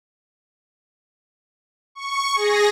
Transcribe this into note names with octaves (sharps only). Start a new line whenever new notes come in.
C#6
G#4 A#6